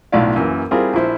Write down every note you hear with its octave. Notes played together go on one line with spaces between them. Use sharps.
B1 A2 E4 F4 D5 F5
F#2 E3 A#3
G3 C4 E4 F4 G#4 A#4
A#1 F3 E4 C5